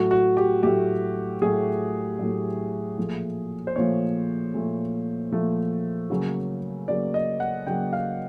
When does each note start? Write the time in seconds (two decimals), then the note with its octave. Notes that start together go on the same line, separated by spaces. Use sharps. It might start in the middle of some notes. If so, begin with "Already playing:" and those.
Already playing: A2 F#3 A3 F#4
0.11 F#4
0.37 G4
0.63 A2 F#3 A3 G4
1.41 A2 F#3 A3 G#4
2.19 A2 F#3 A3
2.98 A#2 F3 A3
3.67 C5
3.76 A#2 F3 A3 C#5
4.54 A#2 F3 A3
5.31 A#2 F3 A3
6.10 C#3 F#3 A#3
6.88 C#3 F#3 A#3 D5
7.14 D#5
7.40 F#5
7.66 C#3 F#3 A#3 G5
7.93 F5